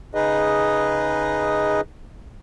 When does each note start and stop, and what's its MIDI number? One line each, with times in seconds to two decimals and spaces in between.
0.15 1.81 49
0.15 1.81 63
0.15 1.81 68
0.15 1.81 71
0.15 1.81 75